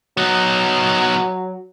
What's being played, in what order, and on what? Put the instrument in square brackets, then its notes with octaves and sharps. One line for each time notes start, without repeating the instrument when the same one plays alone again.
[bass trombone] F#3 [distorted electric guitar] B3 D#4